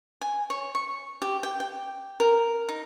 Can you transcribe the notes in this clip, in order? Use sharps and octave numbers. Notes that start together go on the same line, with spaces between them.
G#5
C#5
C#6
G4
G5
G5
A#4
D#4